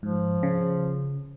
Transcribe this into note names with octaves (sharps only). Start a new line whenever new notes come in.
G#2 F3
C#3